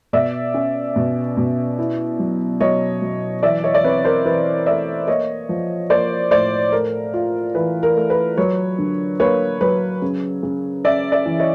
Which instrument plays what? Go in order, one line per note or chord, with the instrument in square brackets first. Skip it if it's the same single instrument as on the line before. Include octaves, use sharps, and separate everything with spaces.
[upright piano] B2 D5 E5
C#4
B2
B2
E4
F#3
F#3 C#5 D#5
F#3
E3 D5 E5
C#5 D#5
D5
C4 B4 C#5
A#4 C5
E3 B4
A3 D5 E5
A#3 C#5 D#5
F3
A#3 C5 D5
A2 C5 D5
A3 A#4
F4
E3 B4
A#4
A3
B4
F#3 B4 C#5
D3
A#3 B4 C#5
F#3 B4 C#5
C#3
C#3
C#4 D5 E5
D5 E5
E3
C#5 D#5